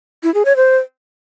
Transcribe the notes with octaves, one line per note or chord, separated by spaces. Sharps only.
E4
G#4
C#5
C5